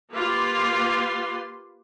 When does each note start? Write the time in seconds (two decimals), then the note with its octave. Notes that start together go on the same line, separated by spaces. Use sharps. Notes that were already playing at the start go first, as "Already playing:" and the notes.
0.12 A#3 F4 G4 B4 C6